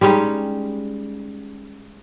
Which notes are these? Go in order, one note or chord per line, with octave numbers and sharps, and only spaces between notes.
G3 G#3 C#4 D#4